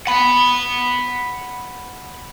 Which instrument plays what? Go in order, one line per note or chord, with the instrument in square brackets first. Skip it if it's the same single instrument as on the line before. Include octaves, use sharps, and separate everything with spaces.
[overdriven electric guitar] F#5 B5